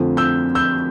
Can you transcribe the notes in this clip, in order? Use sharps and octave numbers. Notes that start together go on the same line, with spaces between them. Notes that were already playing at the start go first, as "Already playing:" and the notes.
Already playing: F2 D3 F3 A3
E6 G6
E6 G6